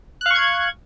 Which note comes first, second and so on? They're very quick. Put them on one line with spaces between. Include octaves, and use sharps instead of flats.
F#6 F5 C#6 G#6